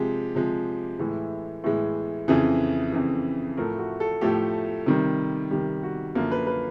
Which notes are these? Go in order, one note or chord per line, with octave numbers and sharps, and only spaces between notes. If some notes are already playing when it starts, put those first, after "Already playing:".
Already playing: C3 F3 G#3 G4
C3 F3 G#3
A2 E3 G#3
A2 E3 G#3
F2 C#3 E3 G#4
F2 C#3 E3
A2 F3 A3 A#4
F#4
A4
A2 F3 A3 G4
C3 D#3 G3
C3 D#3 G3 G4
F#4
F#2 D3 F3 A#3 F4
B4
B4